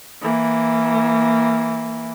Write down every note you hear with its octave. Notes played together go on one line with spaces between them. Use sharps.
E3 A#3